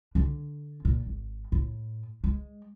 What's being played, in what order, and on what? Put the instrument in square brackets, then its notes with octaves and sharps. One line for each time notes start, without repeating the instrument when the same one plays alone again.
[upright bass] D3 D4
A#2
G#1
A2
G#3